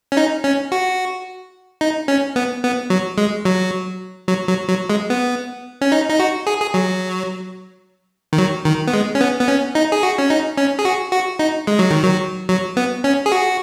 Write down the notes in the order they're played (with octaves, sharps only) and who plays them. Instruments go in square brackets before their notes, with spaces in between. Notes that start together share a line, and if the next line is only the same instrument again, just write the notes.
[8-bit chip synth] C#4
D#4
C#4
F#4
D#4
C#4
B3
B3
F#3
G#3
F#3
F#3
F#3
F#3
G#3
B3
C#4
D#4
D#4
F#4
G#4
G#4
F#3
D#3
F#3
D#3
B3
G#3
C#4
B3
B3
C#4
D#4
G#4
F#4
C#4
D#4
C#4
G#4
F#4
F#4
D#4
G#3
F#3
D#3
F#3
F#3
B3
C#4
G#4
F#4